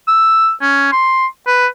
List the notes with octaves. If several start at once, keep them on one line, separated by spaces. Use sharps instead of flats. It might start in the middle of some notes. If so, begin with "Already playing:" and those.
E6
C#4
C6
B4